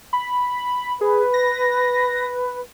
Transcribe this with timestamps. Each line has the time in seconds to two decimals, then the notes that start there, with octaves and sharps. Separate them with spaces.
0.13 B5
1.01 G#4 B4
1.34 A#6